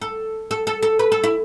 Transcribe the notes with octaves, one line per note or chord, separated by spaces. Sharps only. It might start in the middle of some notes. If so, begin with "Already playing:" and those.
A4
A4
A4
A4
B4
A4
E4